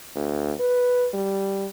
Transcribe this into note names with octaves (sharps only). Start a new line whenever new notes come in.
D2
B4
G3